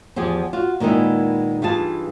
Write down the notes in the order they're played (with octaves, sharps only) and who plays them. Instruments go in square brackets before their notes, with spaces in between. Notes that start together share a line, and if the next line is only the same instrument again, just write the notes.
[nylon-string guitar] E2 F3 G4 G#4
F4 F#4
A#2 D#3 G#3 B3 D#4 E4
G2 E3 D#4 F4 G#4 A5